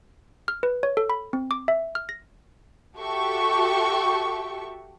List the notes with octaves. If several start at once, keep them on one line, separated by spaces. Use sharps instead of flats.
F6
B4
C#5
A4
B5
C4
D6
E5
F6
A#6
F#4 G4 A4 E5 G5 C#6